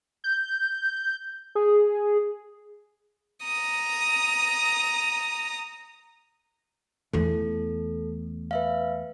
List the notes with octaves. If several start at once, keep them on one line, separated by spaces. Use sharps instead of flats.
G6
G#4
A#5 D#6
E2 A3 A4
B4 E5 F5